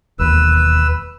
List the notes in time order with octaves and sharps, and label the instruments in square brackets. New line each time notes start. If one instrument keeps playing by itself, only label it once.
[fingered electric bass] E1 D#2 [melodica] B4 E6